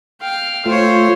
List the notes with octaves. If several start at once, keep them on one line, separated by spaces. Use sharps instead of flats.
F5 G5
A3 F4 C5 C#5